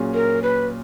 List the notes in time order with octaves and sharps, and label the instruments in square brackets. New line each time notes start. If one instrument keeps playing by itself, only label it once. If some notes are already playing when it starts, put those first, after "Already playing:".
Already playing: [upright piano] A#2 F#3 C#4 G#4
[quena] A#4
B4